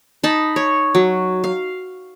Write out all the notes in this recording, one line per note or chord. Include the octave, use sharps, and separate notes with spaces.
D#4 A5 B5
C#5
F#3
F5